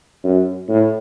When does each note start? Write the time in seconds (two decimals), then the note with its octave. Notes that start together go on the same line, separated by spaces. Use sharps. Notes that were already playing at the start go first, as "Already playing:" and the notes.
0.24 F#2
0.68 A2